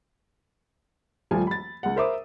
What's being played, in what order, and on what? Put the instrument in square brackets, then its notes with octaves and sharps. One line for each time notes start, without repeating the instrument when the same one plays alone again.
[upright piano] D#1 F3 G3 A3 G#5
B5 A6
C#2 F#5
A#4 C5 E5 B5 D6 D#6